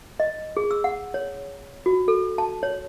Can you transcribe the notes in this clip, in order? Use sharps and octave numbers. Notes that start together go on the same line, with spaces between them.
D#5
G#4
E6
F#5
C#5
F#4
A4
A5
C#5